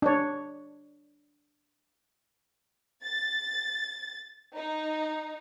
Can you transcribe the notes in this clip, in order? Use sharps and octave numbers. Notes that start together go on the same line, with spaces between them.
D4 C#5
A6
D#4